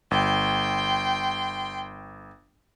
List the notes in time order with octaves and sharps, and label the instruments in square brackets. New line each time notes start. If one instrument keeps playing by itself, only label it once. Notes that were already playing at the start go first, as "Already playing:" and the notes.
[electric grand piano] G1 [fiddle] G5 C6